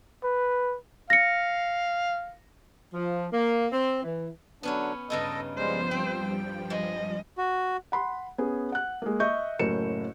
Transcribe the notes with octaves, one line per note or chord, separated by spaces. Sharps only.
B4
F5 A#6 C#7
F3
A#3
C4
E3
D3 F#3 B3 C#4 D4 C#5
G2 C#3 D#4 A4 D#5
F3 G3 G#3 B3 C5
G2 F3 G3 C4 G5
G#3 D#5
F#4
F#5 B5 C6
B3 C#4 G#4
F#5 F#6
G#3 A#3
D#5 E5 C#6 G6
F#1 F#2 A2 A#4 C#7 E7